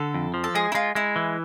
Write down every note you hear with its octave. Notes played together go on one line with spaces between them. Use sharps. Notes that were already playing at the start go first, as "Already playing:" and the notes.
Already playing: D3 A4
F2
F3
A4
G#3 G#4
E4
G#3 F4
G#3 E4
E3